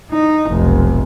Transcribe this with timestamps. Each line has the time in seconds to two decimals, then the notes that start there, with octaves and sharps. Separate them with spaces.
0.11 D#4
0.50 F1 B1